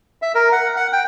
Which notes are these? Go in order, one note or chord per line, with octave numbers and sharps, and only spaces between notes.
E5
A#4
F#5
F#5
G5